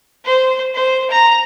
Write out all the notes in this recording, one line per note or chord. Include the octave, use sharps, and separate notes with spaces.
C5
C5
A#5